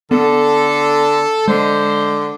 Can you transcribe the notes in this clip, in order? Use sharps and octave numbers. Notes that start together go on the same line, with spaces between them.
D3 B3 A4
D3 G#3 C5